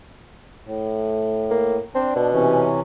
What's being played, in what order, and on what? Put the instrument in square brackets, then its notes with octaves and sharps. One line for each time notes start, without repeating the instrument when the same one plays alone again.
[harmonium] A2
[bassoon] A#3
[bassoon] C4 [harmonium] D4
[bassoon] B2
[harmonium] C3 E3 C#4